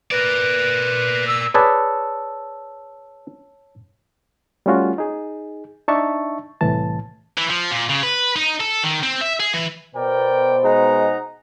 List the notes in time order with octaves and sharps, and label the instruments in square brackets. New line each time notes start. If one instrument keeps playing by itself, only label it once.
[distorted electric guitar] A#4 D5 [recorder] B4
[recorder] E6
[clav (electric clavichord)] G#4 B4 D5 [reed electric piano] C#5 A5 E6
[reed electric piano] G3 A3 C#4 F4 F#4
D#4 G#4
D4 D#4 E5 A5 C#6
C2 A2 E3 A5
[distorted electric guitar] E3
F3
A#2
C#3
B4
D#4
A4
D#3
C4
E5
G#4
E3
[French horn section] B2 C5 [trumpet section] A#4 D5 G5
[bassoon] G#3 [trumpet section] D#4 F#5 A#5